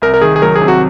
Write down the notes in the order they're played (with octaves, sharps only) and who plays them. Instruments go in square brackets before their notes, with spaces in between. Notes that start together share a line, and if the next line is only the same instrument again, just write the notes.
[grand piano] C2 [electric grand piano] A#4
[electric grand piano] A#4
[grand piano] D#3 [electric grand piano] G#4
[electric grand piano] G#4
[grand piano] F#3 [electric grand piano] A#4
[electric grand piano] G#4
[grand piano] C3
[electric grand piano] F#4